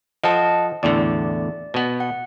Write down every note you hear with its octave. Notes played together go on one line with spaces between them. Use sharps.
F3 A4 D#5 F#5 A5
E2 A2 D3 D5
B2 B3
F#5